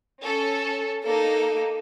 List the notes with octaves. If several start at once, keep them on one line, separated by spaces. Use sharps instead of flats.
C#4 A4
A#3 D#4 A4